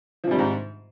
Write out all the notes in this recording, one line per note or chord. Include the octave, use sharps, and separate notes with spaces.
G#2 C3 D#3 F3 G3